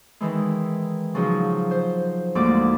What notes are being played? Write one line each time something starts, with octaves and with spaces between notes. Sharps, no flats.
D#3 E3 G#3
C#3 F3 F#3 D#4 G#4
C5
D2 G#2 G#3 A#3 D5 D6